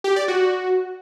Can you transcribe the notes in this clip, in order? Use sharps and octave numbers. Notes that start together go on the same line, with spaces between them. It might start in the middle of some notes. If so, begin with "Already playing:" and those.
G4
D5
F#4